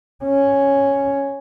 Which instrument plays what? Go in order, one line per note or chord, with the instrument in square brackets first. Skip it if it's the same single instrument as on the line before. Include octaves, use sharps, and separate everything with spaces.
[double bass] C#4